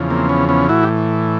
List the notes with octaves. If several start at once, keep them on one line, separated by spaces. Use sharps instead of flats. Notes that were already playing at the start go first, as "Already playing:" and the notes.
Already playing: E2 C#3 F3
A#3 C4
B3 C#4
B3 C#4
A2 E3 E4 F#4
G4